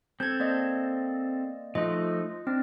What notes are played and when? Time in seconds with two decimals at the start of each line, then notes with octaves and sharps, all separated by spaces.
0.20 C4 A4 G6 G#6
0.40 A#3 D5 D#5
1.75 F3 A3 D#4 F4 D#5
2.47 C4 D4